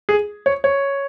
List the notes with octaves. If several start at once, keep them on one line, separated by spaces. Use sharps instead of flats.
G#4
C#5
C#5